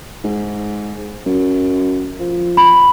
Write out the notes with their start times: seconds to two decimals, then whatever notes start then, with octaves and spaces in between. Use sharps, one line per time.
0.24 G#2
1.26 F#2
2.20 F3
2.57 B5